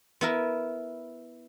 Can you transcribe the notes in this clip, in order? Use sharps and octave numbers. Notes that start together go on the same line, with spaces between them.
B3 E4 A#4